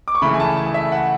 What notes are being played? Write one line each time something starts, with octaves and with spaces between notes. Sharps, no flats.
D6
C#6
C#3 E3 A3 E4 B5
G#5
A5
A5
E5
F#5